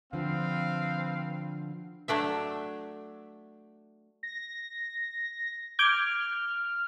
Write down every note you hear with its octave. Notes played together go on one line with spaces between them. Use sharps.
D3 F3 C4 B4 F5
F#3 A3 D4 E5
A#6
D6 F6 G6 G#6